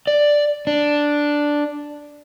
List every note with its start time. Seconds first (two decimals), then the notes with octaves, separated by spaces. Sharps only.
0.07 D5
0.67 D4